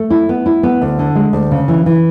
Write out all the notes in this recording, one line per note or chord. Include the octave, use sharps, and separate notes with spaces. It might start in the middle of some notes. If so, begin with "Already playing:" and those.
Already playing: A3
E4
B3
E4
B3
D2
D3
G#3
D2
C#3
E3
E3